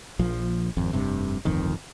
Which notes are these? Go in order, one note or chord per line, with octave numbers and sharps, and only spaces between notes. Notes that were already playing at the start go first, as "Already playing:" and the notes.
A#1 F3
G#1 F2
F1 G2 C3
D1 G1 F2 D#3